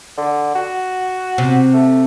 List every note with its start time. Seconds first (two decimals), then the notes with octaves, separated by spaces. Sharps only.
0.18 D3
0.55 F#4
1.38 C3
1.73 A3